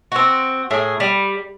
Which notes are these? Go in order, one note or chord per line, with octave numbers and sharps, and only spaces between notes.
C4 F#4
A2 G#4
G3